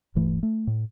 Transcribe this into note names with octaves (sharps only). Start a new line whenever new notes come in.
D1 G2 E3 A3
A3
A2